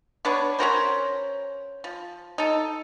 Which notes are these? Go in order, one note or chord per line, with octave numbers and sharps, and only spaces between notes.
B3 D4 B4 C#5
C#4 F#4 A#4 C5
F3
D#4 A4